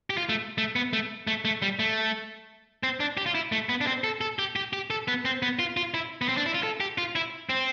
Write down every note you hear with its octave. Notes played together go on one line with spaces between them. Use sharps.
G4
F4
A3
A3
B3
A3
A3
A3
G3
A3
C4
D4
G4
F4
E4
A3
B3
D4
C4
A4
A4
G4
G4
G4
A4
B3
C4
B3
F4
F4
E4
B3
C4
D4
E4
F4
A4
G4
F4
E4
C4